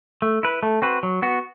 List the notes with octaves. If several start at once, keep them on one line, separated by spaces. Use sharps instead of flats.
A3
E4 B4
A3
C4 F#4 B4
F#3
B3 F#4